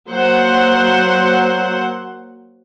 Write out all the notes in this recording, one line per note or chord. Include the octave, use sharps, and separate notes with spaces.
F#3 A#3 C5 F#5